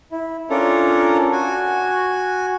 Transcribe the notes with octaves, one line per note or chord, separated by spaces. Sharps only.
E4
C#4 D4 F4 A4 A#4
F#4 G#5